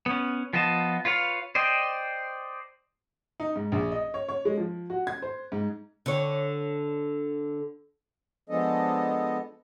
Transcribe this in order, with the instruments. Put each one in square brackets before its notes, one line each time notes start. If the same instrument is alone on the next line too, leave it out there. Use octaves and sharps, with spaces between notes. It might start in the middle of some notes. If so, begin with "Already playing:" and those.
[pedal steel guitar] B3 C#4
F3 B3 F4 D#5 A5
F4 B4 C#5 F5
C5 D5 D#5 G5
[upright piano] D#4
G#2
A#1
D#5
C#5
C#5
G#3
F3
F#4
G#6
C5
G#2
[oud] D3 C#5
[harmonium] F3 G#3 B3 D4 A4 D#5